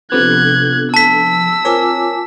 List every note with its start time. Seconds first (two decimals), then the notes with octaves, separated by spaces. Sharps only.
0.12 C3 F3 B3 D4 A4 F#6 G#6
0.94 A5 E6 B6
1.65 C4 F4 A#4 C#5 G#5 D6